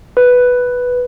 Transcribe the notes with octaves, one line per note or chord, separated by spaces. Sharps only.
B4